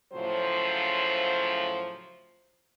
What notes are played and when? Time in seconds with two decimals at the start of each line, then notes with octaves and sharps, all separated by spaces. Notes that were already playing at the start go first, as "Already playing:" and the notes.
0.13 A2 C#3 F3 F#3 C5